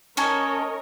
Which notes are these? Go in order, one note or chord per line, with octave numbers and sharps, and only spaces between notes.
C#4 A4 A#4 C#5 D#5 G#5